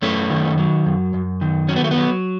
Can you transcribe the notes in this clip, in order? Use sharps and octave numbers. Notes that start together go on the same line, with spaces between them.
F#2 A3 C#4
D#3
F#3
F#2
F#2
D#3
F#3 C#4
B3
A3
B3
F#3